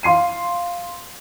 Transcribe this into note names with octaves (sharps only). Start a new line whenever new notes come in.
F5 C6 C7 D#7